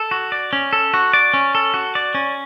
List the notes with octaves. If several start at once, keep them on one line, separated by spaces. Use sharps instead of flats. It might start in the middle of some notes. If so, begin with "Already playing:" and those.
Already playing: A4
F#4
D5
C#4
A4
F#4
D5
C#4
A4
F#4
D5
C#4